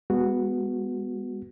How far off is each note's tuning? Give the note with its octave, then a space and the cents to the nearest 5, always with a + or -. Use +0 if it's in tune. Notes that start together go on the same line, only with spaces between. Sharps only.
G#3 -35 B3 +0 F#4 -5